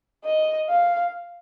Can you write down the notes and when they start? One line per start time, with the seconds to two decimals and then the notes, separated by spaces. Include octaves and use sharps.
0.25 D#5
0.69 F5